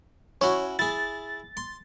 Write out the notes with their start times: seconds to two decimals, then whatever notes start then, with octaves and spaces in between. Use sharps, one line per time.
0.41 C#4 E4 F#4 C#5
0.79 E4 G#4 A6
1.57 C6